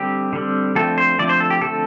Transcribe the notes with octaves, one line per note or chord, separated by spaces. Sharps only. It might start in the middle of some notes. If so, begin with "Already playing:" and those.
Already playing: D3 G3 C4 G4
D3 G3 C4
D3 F3 A3 C4 A4
C5
D3 F3 A3 C4 D5
C5
A4
G4
D3 F3 A3 C4 A4